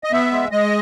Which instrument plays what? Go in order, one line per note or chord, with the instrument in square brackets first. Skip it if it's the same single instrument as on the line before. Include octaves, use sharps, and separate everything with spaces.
[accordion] D#5
B3 E5
G#3
G#3 D#5